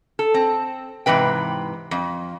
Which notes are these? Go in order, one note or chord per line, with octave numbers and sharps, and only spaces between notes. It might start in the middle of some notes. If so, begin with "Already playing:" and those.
A4
C4
G#2 C3 E3 B4 G5
F2